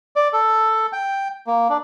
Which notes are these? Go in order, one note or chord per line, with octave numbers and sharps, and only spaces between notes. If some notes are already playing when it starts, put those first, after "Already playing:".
D5
A4
G5
A#3
D4